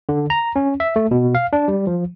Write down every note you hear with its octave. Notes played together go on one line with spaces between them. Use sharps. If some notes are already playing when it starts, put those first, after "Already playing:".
D3
A#5
C#4
E5
A3
B2
F5
D4
G3
F3